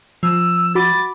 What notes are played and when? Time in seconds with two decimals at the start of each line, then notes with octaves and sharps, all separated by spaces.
0.23 F3 E6
0.75 F#4 B5 D6 A6